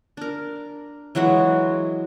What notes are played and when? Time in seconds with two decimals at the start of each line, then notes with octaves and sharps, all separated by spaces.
0.17 D4 A#4
1.15 E3 F#3 G#3 F#4